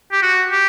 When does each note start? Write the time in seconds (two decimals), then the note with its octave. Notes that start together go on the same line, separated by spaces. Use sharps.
0.12 G4
0.22 F#4
0.51 G4